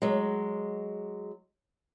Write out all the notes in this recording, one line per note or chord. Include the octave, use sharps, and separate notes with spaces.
F#3 G#3